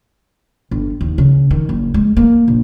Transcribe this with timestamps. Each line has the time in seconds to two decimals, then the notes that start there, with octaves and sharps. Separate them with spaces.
0.71 G1
1.01 D#2
1.18 C#3
1.51 D#3
1.69 F#1
1.94 G#3
2.17 A#3
2.48 A#1